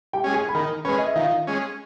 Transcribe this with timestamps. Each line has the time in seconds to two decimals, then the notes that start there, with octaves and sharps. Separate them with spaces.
0.13 G4 G5
0.24 G#3 C#4
0.33 G#4 G#5
0.49 B5
0.54 D#3 A#4 A#5
0.85 G#3 C#4 B4 B5
0.98 D#5
1.07 E5
1.15 D#3 F4 F5
1.47 G#3 C#4